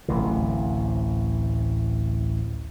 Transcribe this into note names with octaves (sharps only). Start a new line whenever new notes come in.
D1 A1 C3